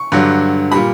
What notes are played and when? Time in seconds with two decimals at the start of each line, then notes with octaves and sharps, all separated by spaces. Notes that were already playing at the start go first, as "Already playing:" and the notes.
Already playing: C#6
0.12 G2 D3 F#3
0.72 A#2 G3 B5